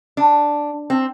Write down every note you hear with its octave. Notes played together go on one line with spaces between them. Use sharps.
D4
C4